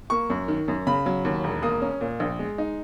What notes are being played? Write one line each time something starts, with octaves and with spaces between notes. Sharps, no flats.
A#3 C#6
F#2
D#3
F#2
C#3 B5
F#3
D#2
E1
A#3 D#6
C#4
A#2
A#1
G#3
D#4